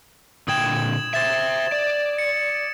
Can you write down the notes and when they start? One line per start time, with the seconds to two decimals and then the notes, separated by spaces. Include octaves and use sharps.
0.48 A#2 D3 G5 D#6 G#6 E7
1.14 C5 E5 A6 E7
1.72 D5
2.18 C#7